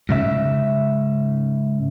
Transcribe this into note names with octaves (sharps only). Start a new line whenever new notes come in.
G#2 C#3 E5